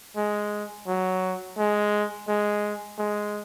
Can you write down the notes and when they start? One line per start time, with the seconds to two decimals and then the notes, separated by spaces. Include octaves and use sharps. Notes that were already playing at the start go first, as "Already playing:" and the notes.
0.16 G#3
0.87 F#3
1.58 G#3
2.28 G#3
2.98 G#3